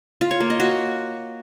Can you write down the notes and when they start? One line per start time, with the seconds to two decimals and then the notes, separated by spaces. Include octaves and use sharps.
0.21 F4
0.31 C#5
0.40 A#3
0.50 D#5
0.60 F#4